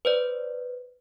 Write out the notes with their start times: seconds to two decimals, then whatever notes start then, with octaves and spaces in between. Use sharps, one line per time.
0.05 B4 C5 D5